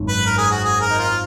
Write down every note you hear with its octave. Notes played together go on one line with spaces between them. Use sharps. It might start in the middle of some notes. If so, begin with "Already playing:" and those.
Already playing: G#1 F#2 D#3
B4
A#4
G#4
F#4
G#4
A#4
D#4
F4